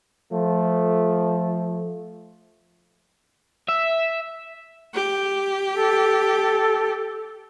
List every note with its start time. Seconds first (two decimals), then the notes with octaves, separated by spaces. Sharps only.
0.32 F3 A3
3.68 E5
4.94 G4
5.76 A4